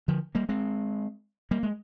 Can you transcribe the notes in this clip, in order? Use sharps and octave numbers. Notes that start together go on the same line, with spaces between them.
D3 F3
G3 A#3
G#3 C4
G3 A#3
G#3